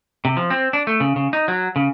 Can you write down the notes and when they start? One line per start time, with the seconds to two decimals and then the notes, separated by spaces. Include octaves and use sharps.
0.25 C3
0.37 F3
0.50 C4
0.73 D4
0.87 A3
1.00 C#3
1.16 C#3
1.33 D#4
1.48 F#3
1.76 C#3